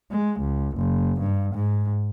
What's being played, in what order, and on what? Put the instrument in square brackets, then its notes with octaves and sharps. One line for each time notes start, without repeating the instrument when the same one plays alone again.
[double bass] G#3
C#2
F#1
G2
G#2